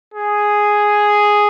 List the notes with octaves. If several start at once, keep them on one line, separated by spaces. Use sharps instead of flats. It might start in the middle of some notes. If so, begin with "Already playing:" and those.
G#4